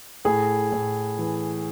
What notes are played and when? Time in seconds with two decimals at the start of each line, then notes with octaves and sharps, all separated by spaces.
0.25 A2 G#4
0.72 A2
1.18 E3